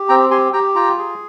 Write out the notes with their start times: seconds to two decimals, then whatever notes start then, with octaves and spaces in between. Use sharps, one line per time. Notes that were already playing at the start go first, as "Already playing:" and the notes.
Already playing: G4
0.09 C4 G5 A#5
0.31 G4 G#5 C6
0.53 G4 G5 A#5
0.75 F4 G5 A#5
0.98 G#4